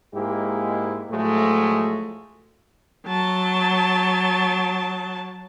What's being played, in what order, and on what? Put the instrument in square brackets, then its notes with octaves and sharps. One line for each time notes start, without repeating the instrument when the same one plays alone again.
[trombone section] G#2 G#3 A#3 E4 G4 G#4
A2 F3 F#3 G#3 A3
[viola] F#3 A5